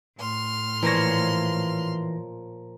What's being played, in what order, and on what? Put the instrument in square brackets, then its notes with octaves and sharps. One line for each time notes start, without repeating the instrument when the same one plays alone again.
[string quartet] A2 C6 F6
[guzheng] A#2 F3 C#5 [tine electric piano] E3 A#6